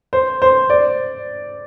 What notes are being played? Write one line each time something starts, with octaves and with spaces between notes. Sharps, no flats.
C5
C5
D5